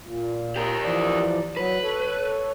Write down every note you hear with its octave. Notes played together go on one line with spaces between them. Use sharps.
A#2
G4 A#4
E3 F3 D5
F#3 B4
A4 C#5